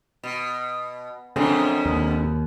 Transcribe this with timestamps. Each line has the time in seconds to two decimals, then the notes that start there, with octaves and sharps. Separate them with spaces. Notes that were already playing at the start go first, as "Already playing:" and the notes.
0.24 B2
1.36 F#2 B2 D3 F3 C4 G#4
1.86 D#2